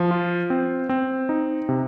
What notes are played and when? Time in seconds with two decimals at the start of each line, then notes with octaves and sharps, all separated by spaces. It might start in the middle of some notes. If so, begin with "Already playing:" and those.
Already playing: F3
0.11 F4
0.50 C4
0.89 C4
1.29 D#4
1.69 C3